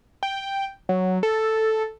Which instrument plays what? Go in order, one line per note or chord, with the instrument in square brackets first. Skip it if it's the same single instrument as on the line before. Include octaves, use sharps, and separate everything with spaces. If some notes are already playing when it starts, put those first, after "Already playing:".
[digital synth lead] G5
F#3
A4